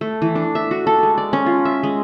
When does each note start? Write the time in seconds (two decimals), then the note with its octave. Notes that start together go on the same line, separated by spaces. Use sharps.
0.01 A3
0.22 E3
0.35 D4
0.55 E5
0.71 F#4
0.87 A4
1.03 G#3
1.18 D5
1.33 C#4
1.46 F4
1.65 E5
1.83 G#3